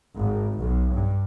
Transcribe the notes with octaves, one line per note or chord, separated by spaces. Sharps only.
G#1
B1
G2